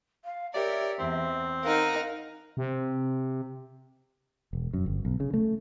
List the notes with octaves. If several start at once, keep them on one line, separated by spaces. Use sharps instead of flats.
F5
G4 A#4 C#5 D5 E5
E2 C4
D#4 A#4 F5 F#5 F6
C3
E1
F#2
G1
B1
C#3
A3